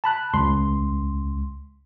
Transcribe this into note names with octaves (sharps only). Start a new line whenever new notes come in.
A5 B5 F#6
C#2 C6